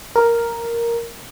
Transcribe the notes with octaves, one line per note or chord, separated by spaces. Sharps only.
A#4